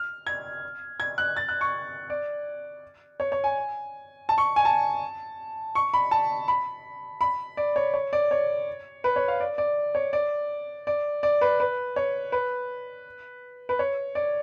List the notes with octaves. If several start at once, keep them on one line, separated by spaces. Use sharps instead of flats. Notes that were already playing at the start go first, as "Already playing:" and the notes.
Already playing: F6
G#6
G#6
F#6
A6
F#6
C#6
D5
C#5
C#5
G#5
A5
C#6
G#5
A5
C#6
B5
A5
B5
B5
D5
C#5
C#5
D5
C#5
B4
C#5
F5
D5
D5
C#5
D5
D5
D5
B4
B4
C#5
B4
B4
C#5
D5